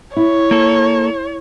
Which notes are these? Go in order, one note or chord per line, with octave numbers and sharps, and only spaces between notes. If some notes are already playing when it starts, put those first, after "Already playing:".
E4 C#5
A#3 A4